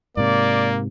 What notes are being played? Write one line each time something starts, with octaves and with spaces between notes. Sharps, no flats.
G#2 C3 A#3 D5